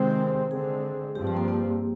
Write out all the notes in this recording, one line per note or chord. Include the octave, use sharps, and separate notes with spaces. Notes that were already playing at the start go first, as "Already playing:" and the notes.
Already playing: C3 D#3 G#3 C4 C5
D3 G#3 C4 G#4
G2 F3 C4 G4
G4
A#3
A#3